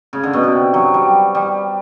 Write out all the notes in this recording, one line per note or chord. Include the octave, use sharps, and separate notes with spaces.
C#3
D3
B2
C3
F#3
G3
G3